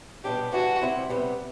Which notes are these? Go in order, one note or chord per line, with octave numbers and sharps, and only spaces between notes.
B2 G3 D4 G4
E3 G3 D4 F#4
C3 G3 C4 E4
C3 G3 B3